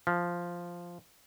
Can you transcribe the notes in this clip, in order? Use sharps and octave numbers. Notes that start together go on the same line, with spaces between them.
F3